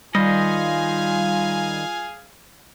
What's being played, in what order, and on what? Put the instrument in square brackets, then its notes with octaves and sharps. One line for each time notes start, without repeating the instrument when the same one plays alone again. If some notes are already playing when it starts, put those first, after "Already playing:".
[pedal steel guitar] D#3 C5 D#5 [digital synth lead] G3 [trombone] F4 [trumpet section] G#4 F5 G#5